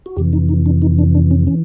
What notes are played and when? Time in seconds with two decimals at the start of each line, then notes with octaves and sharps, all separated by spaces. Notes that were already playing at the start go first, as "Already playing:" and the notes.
0.06 F#4
0.16 F2 C3 E3 G4
0.33 D#4
0.49 D#4
0.66 D4
0.82 D#4
0.99 D4
1.15 D4
1.31 C#4
1.47 E3 C#4